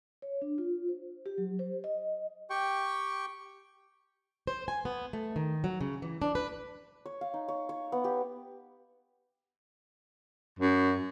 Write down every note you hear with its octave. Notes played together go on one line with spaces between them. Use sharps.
C#5
D4
F4
C5
G4
F#3
C5
D#5
G4 G5 C#6
C5
G#5
B3
A3
D#3
F#3
C#3
E3
D4
B4
C#5
F5
D#4
C#5
C#5
B3
G4
F#2